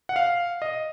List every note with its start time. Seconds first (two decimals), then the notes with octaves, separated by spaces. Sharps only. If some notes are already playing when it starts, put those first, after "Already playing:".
0.09 F#5
0.16 F5
0.62 D#5